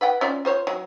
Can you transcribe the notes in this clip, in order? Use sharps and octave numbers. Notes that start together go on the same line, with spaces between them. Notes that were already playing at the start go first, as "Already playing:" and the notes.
B4 F#5 G5
C#4 F4 D5
F4 C5 C#5
F#3